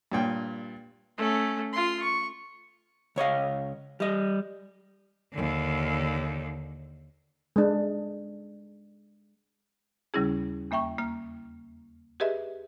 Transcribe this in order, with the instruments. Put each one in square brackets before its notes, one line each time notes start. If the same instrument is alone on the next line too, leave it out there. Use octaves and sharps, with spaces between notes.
[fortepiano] G2 A#2 G5
[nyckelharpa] A3 C#4
F4 C6
C#6
[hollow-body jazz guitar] C#2 C#5 D#5 F5
G3 D#5
[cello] D#2 D3
[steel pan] G#3 D4
[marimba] D#2 C#3 G3 C#4 E4 G#4
E2 A#3 E5 G5 C#6
A#3 F6
G4 G#4 B4 D#5 E5